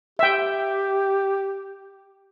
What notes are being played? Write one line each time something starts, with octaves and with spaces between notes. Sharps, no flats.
G4 E5 G5